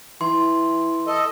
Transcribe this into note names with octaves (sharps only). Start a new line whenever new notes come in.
E3 C6
A4 D#5